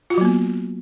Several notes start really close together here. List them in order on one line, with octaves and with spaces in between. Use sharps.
F4 F#4 F#3 A#3 B3